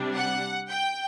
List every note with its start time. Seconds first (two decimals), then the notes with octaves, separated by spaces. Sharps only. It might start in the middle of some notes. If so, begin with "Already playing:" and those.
Already playing: C3 G3 D4
0.15 F#5
0.68 G5